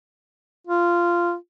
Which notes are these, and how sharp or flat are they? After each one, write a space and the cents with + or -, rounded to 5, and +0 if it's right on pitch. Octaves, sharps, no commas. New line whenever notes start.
F4 -10